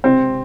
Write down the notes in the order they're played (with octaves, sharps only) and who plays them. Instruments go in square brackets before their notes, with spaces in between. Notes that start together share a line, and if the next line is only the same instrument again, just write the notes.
[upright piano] C3 C4